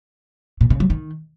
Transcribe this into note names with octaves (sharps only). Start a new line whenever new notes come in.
A#2
C#3
F#3
D#3